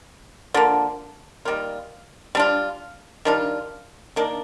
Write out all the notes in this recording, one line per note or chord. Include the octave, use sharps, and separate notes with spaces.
D3 F3 A#3
D#3 G3 A#3 F4
G3 D4 F4
D#3 G3 D4 F4
D#3 A#3 D4